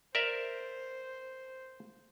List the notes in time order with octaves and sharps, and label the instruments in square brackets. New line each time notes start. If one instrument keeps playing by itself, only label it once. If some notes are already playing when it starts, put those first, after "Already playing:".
[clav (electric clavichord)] A#4 D5 E5 [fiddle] C5